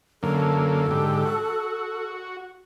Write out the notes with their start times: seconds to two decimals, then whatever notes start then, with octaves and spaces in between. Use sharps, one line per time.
0.23 F#2 D3 A#3 A4
0.91 G#2 D3 G4
1.25 F#4